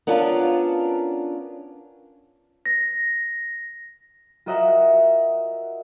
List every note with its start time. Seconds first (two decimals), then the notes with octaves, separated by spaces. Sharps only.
0.07 B3 C#4 D4 F4 A#4
2.66 A#6
4.46 F4 F#4 A#4 D#5 E5 F#5